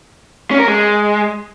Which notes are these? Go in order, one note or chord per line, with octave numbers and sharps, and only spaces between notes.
C#4
A#4
G#3